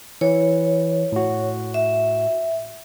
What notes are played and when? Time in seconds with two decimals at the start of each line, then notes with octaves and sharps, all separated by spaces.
0.21 E3 C#5
1.12 A2 F#4
1.74 E5